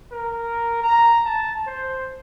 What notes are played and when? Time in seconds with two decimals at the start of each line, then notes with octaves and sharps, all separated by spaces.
0.12 A#4
0.83 A#5
1.26 A5
1.67 C5